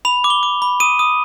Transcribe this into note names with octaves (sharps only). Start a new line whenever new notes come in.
B5 F7
D6
G7
D6
B5
D#6 D#7
D#6